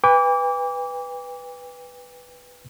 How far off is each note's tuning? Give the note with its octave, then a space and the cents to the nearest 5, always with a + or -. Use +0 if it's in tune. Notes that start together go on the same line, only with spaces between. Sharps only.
B4 +0 G5 +45 D6 -25